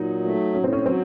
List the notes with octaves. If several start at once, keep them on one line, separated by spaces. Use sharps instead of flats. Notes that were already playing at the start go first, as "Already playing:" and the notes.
Already playing: A#2 F#3 D#4
A3
A2 C#4
C4
C#4
F#3 C4